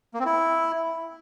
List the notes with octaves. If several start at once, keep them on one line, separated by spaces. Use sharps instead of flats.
A#3
C4
E4